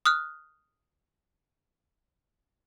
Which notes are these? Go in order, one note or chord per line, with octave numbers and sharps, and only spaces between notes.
D#6 F6 F#6